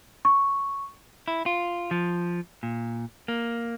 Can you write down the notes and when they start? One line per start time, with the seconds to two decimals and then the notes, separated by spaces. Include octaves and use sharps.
0.25 C#6
1.28 E4
1.46 F4
1.91 F3
2.63 A#2
3.28 A#3